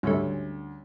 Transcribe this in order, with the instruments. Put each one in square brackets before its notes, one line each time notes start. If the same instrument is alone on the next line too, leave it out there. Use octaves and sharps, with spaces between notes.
[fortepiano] D2 [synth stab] G#2 C#3 A3 [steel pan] G3 C#4